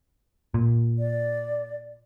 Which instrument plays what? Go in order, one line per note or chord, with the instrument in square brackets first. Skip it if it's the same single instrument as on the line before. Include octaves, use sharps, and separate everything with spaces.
[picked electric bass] A#2
[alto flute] D5